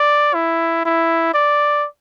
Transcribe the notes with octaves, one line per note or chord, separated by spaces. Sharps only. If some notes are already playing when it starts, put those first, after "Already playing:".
Already playing: D5
E4
E4
D5